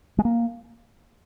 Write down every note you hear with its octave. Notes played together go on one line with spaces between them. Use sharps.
G#3
A#3